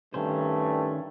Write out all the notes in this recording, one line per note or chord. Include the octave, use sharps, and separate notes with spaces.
G2 D#3 A3 C#4 C5